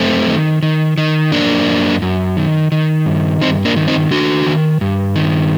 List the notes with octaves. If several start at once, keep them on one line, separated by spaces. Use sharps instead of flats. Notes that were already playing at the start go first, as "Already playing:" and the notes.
Already playing: F#2 A3 C4
D#3
D#3
D#3
F#2 A#3 D4
F#2
F#2
D#3
D#3
G2
G2 C4 D#4
A#3 D4
D#3
C4 D#4
D#3 D4 F#4
D#3
G2
D#3